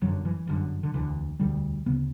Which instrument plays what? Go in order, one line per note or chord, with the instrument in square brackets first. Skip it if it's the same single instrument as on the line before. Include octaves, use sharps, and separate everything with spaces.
[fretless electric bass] G1 F#2 D3 F#3
E3
G1 F#2 D3
D3
E1 D2 D3 E3
E1 D2 D3 G3
D2 C#3 B3